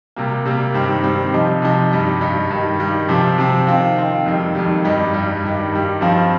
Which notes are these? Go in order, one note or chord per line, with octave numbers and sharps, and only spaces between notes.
C3 G3 A#3
C3 G3 A#3
G2 D#3 G3 C4
G2 D#3 G3 C4
C3 F3 D#4
C3 F3 D#4
G2 G3 D#4
G2 G3 D#4
G2 D#3 G3
G2 D#3 G3
C3 F3 C4
C3 F3 C4
D#3 C4 F4
D#3 C4 F4
F2 D#3 G3
F2 D#3 G3
G2 G3 D#4
G2 G3 D#4
G2 D#3 G3
G2 D#3 G3
G2 F3 C4 F4